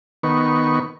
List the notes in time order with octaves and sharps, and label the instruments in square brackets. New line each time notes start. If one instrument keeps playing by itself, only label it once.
[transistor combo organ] D#3 B3 C#6